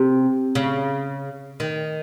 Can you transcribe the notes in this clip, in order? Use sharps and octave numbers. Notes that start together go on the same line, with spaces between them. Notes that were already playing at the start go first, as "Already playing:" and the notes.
Already playing: C3
C#3
D#3